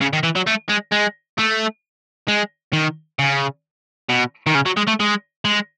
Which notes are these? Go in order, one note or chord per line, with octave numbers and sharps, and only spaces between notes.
C#3
D#3
E3
F#3
A3
G#3
G#3
A3
G#3
D#3
C#3
B2
D#3
C#3
F#3
G#3
A3
G#3
G#3